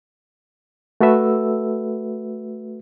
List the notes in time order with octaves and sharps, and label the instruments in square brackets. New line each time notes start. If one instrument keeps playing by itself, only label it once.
[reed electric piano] A3 F#4 A4 B4 E5 E6